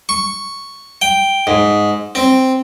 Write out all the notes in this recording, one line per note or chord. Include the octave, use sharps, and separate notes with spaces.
C#6
G5
G#2
C4